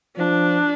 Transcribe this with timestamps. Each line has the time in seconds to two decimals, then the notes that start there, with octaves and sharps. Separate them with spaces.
0.17 F3 D4